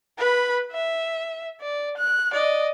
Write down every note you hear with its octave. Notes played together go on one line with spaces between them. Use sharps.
B4 B5
E5
D5
F#6
D5 D#5